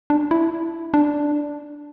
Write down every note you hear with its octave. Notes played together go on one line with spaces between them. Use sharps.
D4
E4
D4